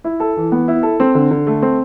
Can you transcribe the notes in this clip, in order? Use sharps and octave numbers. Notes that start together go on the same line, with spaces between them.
E4
A4
E3
B3
E4
A4
C4
D3
D3
A3
C4